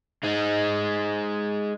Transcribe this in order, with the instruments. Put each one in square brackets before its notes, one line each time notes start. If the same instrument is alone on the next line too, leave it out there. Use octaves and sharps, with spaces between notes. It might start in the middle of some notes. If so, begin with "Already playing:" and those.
[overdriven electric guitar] G#3 D#4